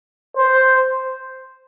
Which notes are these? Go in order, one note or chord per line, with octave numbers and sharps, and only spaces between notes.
C5